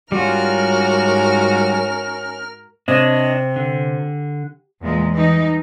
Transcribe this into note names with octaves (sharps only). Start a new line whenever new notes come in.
G#2 G3 C#4 F4 F#4 A#4 F6
C3 D4 C#5 D#5
D3
E2 A#2 G#3
E3 G3 D#4